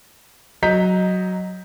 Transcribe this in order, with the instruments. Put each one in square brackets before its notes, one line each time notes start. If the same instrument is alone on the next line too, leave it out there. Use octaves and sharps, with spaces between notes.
[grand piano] F#3 D#5 A#5 G6 B6